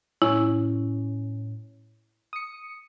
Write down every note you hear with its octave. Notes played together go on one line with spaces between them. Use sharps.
A2 C#4 E4
D#6 C#7